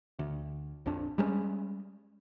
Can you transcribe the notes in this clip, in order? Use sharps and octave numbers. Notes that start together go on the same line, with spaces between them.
D2
A#1 F2 D4
G3 G#3 A#3 C#4